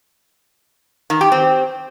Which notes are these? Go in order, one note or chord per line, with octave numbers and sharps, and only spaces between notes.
D#3
G4
C4